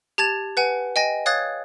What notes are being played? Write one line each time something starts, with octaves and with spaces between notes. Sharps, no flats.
G4 A5 G#6 A6 E7
B4 F#5 G#5
D#5 G5 G#5 A#6
C#5 F5 D#6 F#6 G#6 A6